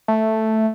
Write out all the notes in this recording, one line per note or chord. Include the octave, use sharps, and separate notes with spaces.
A3